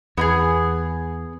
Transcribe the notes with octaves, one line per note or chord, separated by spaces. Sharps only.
E2 B3 E4 G#4